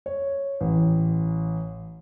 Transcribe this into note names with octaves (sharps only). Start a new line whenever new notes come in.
C#5
A1